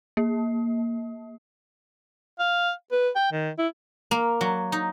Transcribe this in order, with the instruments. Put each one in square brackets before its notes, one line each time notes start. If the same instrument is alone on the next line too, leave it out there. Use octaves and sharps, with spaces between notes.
[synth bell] A#3
[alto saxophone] F5
B4
G5
D#3
E4
[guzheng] A#3
F#3
D#4